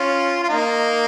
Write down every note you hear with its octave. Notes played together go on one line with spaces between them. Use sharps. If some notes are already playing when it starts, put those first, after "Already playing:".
Already playing: C#4 F4
F4
A#3 D#4